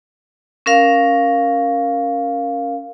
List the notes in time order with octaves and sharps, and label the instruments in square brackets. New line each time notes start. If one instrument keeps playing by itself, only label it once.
[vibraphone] C#4 A#4 F5